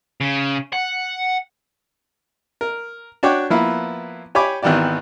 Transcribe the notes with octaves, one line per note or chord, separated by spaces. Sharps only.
C#3
F#5
A#4
D4 F#4 C#5 G5 D6
F3 A#3 B3 E4 B4
G4 C#5 G#5 B5 D6
G#1 D#3 E3 B3 G4 D5